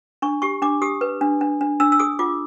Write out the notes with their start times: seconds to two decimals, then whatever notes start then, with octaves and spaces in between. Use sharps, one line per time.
0.22 D4 C#6
0.42 G4 C#6
0.62 D4 D6
0.81 G4 D#6
1.01 B4
1.21 D4
1.41 D4
1.61 D4
1.80 D4 E6
1.92 E6
1.99 G#4 D#6
2.19 F4 D6